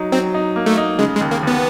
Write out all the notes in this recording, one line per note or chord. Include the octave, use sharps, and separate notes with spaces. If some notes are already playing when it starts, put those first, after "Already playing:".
Already playing: F#3 D#4
F#3 C4
D#4
A#3
A3
D#4
C#3 G#3
G#3
D#2
A#3
D#2 B3